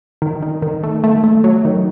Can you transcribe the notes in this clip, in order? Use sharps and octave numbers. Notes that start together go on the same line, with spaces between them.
D#3
D#3
D#3
A3
A3
A3
F#3
D#3